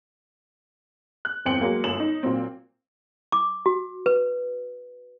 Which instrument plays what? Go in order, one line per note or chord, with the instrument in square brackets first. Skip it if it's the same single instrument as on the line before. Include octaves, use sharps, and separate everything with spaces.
[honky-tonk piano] F#6
G1 E2 C4 G5 C#7 F#7
F#3 G#3 A#3
G1 F#2 E7 F#7
D#4
A#2 F#3 C4
[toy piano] D6
F#4
B4